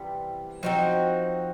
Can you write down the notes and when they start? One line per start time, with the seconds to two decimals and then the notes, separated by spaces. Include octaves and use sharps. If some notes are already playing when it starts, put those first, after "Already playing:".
Already playing: C3 E3 G3 B3
0.62 F3 C4 D#4 F#4